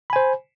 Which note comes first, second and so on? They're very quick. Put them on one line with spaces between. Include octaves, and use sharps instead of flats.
B5 G#5 C5